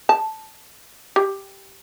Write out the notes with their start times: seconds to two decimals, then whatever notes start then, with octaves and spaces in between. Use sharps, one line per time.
0.09 A5
1.16 G4